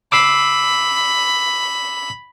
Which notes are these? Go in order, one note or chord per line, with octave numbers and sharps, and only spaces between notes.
B5 D6 E6 C7